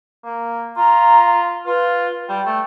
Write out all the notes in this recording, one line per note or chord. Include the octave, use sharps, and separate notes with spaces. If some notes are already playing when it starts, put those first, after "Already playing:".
A#3
F4 A#5
F4 B4
G3 G5
A3